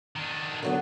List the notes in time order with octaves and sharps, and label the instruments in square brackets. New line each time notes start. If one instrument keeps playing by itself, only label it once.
[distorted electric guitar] D#3 D4
[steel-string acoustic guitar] D3 F#3 B3